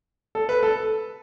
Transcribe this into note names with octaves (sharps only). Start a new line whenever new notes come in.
A4
B4
A4